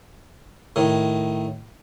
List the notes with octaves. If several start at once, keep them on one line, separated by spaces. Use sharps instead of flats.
A2 D#3